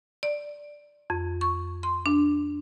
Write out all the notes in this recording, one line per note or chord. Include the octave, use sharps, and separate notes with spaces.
D5
F2
C#6
C6
D4